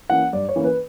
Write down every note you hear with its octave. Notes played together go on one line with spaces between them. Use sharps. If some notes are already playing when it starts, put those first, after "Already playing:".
E3 A#3 C#4 F#5
G2 D5
C#5
E3 A#3 C#4
B4